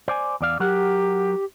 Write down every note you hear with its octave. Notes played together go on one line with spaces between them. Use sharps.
C5 D5 G#5
E2 D5 F5
F#3 G4 A#4 F#5